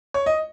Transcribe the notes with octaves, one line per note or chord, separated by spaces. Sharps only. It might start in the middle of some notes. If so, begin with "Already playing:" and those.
C#5
D#5